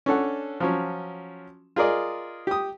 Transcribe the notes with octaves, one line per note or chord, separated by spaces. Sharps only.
C#4 D4 A4 F#5
F3 F#3 C#4
F4 G#4 A#4 D5 D#5
G4 D#6